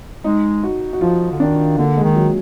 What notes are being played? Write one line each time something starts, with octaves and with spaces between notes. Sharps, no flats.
G#3 D#4
F#4
F#4
F3 F4
D3
D#3 D4
D3 A#3
G#3
D#3
F#3